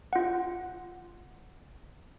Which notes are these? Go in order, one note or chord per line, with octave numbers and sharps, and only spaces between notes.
F4 F#5